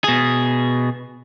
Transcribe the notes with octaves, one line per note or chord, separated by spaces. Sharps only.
B2 G#4